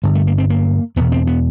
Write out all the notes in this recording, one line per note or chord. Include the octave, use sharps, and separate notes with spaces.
G2 D3 G#3
A3
A#3
C4
A#3
E2 B2 B3
C4
B3